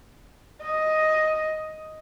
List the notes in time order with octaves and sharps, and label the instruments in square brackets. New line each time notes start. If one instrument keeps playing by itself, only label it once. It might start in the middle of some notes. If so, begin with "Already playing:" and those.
[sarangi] D#5